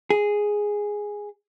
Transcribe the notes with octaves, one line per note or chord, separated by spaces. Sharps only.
G#4